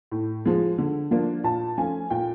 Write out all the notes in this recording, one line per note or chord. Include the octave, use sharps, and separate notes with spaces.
A2
F3 G#3
D3
F3 A#3 D4 F4
A#2 A5
F3 A3 C#4 F4 G#5
A#2 G5